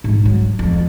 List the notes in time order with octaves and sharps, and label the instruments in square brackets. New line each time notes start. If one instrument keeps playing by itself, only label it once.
[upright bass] G#2
F#3
F2